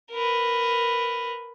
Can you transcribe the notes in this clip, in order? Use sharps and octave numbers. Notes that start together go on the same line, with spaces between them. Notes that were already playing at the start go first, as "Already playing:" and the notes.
A#4 B4